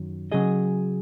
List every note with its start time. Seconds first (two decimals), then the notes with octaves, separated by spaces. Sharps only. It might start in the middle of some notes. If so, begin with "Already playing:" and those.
Already playing: F#2 D#3 F#3
0.32 C#3 F#3 C#4 G#4 D#5